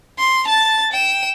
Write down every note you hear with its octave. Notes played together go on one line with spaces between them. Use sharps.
C6
A5 A6
G5 E7